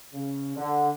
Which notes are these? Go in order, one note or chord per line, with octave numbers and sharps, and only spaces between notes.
C#3
D3